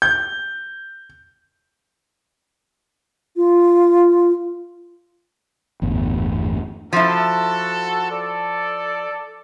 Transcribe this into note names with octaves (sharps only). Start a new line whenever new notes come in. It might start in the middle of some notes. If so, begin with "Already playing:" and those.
G6
F4
G1 E2 A2
F3 E4 F#4 A4
A4 D5